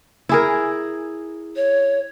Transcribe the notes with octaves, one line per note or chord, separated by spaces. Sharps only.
E4 G#4 A#4
C#5